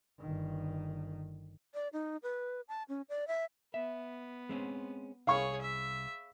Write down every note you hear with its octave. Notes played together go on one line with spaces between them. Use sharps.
G1 D#3
D5
D#4
B4
A5
C#4
D5
E5
B3 E5
G#3 C4 C#4
C2 G#4 C#5 F5 B5 C#6
E5